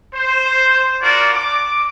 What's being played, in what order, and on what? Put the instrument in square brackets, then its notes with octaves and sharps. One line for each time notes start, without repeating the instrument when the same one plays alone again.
[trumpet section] C5
D4 F4 F#4 A#4 D5
D6